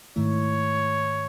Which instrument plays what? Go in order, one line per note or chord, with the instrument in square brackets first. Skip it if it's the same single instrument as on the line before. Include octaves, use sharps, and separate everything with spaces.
[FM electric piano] G#2 D#3 A3 E4 [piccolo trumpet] C#5